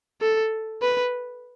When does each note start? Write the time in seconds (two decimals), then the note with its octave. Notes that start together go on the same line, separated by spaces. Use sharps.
0.21 A4
0.82 B4